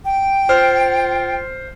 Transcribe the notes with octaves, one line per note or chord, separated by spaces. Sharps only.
G5
F4 C5 F6